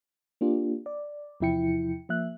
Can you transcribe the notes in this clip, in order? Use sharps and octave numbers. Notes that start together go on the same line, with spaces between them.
A#3 D4 F4 G4
D5
E2 C3 F3 E4 G5 C#7
F3 A#3 E5 F#6